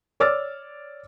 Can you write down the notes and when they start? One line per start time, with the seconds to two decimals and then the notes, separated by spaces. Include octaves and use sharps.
0.20 C#5 D5 D6 E6 F6 A6